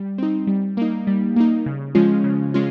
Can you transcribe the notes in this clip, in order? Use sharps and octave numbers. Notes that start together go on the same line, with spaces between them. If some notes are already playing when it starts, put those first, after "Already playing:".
Already playing: G3
C4 D#4
G3
A#3 D#4
G3
A#3 D#4
C#3
F3 G#3 C#4 F4
C#3
G#3 C#4 F4